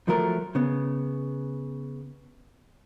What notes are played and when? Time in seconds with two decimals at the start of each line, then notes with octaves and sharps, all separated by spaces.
0.08 F3 F#3 A3 A#4
0.55 C#3 B3